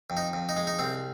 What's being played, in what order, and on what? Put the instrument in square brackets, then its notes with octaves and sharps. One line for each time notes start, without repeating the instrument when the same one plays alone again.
[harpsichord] F2
D#4
F2
D#4
G#3
D#4
C2 C4